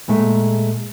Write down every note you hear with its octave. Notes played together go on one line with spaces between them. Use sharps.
A#2 G#3 A3